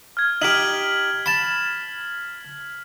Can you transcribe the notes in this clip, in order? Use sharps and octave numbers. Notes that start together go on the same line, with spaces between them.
F6 G#6
D#4 G4 F6 B6 F#7
A5 B5